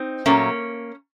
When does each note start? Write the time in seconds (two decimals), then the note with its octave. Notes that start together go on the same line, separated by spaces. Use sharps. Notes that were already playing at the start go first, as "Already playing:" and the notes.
Already playing: C4 D#4
0.26 A#2 F#3 A3 A#3 C#4